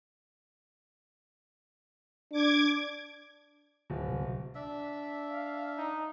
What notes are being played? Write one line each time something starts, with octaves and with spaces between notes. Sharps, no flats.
D4 D6 G#6
D1
C2 C3 B3
D4 E5
F5
D#4